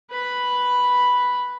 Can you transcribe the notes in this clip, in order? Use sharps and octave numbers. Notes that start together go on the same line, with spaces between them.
B4 B5